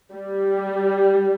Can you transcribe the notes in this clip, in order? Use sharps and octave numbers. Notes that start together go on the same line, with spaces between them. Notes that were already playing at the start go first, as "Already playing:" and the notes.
G3